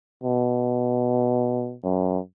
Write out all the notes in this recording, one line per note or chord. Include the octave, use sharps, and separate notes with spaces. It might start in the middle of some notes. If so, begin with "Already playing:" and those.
B2
F#2